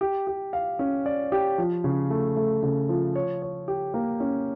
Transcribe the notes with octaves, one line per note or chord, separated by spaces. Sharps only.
G4
G4
F5
C#4
D5
G4
F3
C#3
A3
A3
C#3
F3
C#5
C#5
G4
A#3
C#4